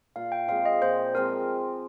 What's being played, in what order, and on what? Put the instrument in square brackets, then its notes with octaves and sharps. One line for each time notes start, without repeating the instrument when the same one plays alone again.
[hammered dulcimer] A#2 [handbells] F5
[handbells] G5
[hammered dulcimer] F3 G#3 C4 [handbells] F5
[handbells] D#5
[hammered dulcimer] A#2 [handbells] C5
[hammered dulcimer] F3 G#3 C4 [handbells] A#4